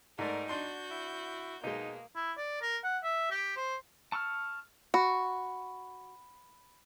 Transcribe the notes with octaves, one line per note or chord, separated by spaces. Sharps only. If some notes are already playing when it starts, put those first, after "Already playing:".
G#2 A3 D#4 A#4 D5
D4 F#4 C6 G6
E4
B2 G#3 A#3 D#4
E4
D5
A#4
F#5
E5
G4
C5
A5 C#6 E6 F6
F#4 B5